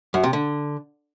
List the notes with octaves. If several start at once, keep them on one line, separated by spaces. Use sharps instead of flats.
F#2
C3
D3